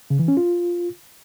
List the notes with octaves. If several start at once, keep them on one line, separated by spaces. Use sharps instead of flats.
C#3
E3
C#4
F4